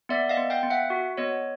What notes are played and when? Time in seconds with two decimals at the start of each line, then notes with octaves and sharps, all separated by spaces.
0.09 B3 D5 E5
0.29 D#5 F5
0.37 B3
0.50 F5 G5
0.63 B3
0.70 E5 F#5
0.90 F#4
1.17 B3 C#5 D#5